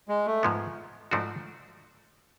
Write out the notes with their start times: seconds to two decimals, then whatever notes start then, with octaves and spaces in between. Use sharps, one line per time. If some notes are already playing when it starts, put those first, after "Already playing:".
0.08 G#3
0.26 A3
0.43 G#2 F3 G#3 B3
1.11 G#2 F3 A3 D4 F#4